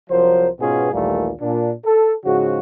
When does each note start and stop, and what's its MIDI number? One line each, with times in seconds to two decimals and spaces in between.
0.10 0.48 36
0.10 0.48 53
0.10 0.48 54
0.10 0.48 70
0.10 0.48 72
0.60 0.91 44
0.60 0.91 47
0.60 0.91 59
0.60 0.91 61
0.60 0.91 65
0.60 0.91 68
0.92 1.32 34
0.92 1.32 39
0.92 1.32 46
0.92 1.32 52
0.92 1.32 55
0.92 1.32 57
1.41 1.73 46
1.41 1.73 62
1.85 2.12 69
2.25 2.59 44
2.25 2.59 49
2.25 2.59 53
2.25 2.59 56
2.25 2.59 66